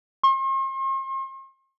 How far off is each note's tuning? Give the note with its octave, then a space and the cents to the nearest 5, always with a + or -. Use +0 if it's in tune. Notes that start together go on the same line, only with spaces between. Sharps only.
C6 +45